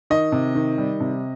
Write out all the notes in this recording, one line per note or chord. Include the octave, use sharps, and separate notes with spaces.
D#3 D#5
C3
D#3
G3
C3